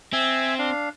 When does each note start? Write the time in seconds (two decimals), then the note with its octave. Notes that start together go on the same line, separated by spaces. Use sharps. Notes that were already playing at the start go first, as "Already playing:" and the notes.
0.13 C4 E5 G#5 E6
0.58 D4 F5